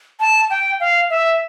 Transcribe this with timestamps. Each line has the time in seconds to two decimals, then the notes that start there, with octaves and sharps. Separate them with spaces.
0.20 A5
0.50 G5
0.80 F5
1.10 E5